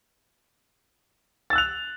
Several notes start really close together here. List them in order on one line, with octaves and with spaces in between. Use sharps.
A6 E6 F#6 F7